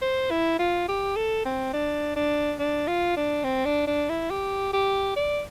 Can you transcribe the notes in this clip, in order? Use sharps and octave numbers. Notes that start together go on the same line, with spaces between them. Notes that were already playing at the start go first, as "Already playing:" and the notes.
C5
E4
F4
G4
A4
C4
D4
D4
D4
F4
D4
C4
D4
D4
E4
G4
G4
D5